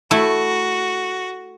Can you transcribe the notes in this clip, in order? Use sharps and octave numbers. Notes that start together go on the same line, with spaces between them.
A3 E4 F#4